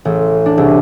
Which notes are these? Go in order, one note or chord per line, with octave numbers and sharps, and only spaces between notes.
A1
D4
C2